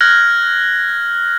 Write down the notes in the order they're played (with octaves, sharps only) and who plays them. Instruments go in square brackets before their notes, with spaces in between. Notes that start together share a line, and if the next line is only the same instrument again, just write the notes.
[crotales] F6 F#6 G#6 A#6 F#7